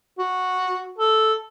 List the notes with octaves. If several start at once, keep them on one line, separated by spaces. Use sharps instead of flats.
F#4
A4